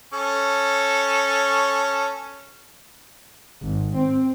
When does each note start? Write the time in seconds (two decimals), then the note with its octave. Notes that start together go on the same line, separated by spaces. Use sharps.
0.13 C#4 A4 C#6
3.63 G#1
3.98 C4